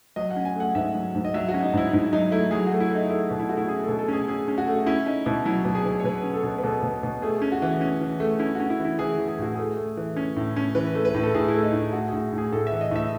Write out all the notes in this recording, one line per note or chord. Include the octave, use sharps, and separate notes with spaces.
F#3 D#5
F#5
C#4
G#5
A3 F#5
G#2 E5
F#3
G#2
D#5
F#3 E5
F#4
C#4
D#4
G#2 E4
G#2 E4
F#3 D#4
A3 E4
F#3 G#4
A3 F#4
E4
A3 D#4
A3 E4
B2
E4
A3 F#4
E4
C#4 G#4
B2 A4
A4
C#4 G#4
C#4 G#4
C#4
F#4
A3
C#4 E4
C#4 D#4
B2 E4
F#3 E4
B2
G#4
B2
C#5
B2 B4
C#4
A4
B2
B4
B2 A4
B2
B2
A3 G#4
C#4
F#4
E3
C#4
E3
A3
C#4 E4
C#4 F#4
E4
E3
E4
E3 G#4
E3
G#4
A2 F#4
A3 G#4
A3
E3
C#4
A2
C#4
E3 B4
A3
B4
A2
A4
A2 G#4
E4
A3
D#4
A2
A2 F#4
A2 G#4
A2
G#4
A2 A4
E5
E3
D#5
A2 E5